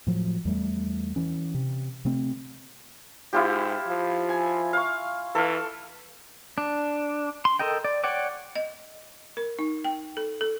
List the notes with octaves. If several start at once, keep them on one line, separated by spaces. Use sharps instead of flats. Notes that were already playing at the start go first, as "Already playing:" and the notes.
A2 F3 F#3
E2 G3 A3
E3 C#4
C3
C3 A3 C4
G#2 E4 F4 G4
F3
G#5
F5 C#6
E3 A4 F5
D4
C6
A4 A#4 D#5 G5
D5
C#5 D5 F#5 G5 D6
D#5
A#4
D#4
G5
A4
A4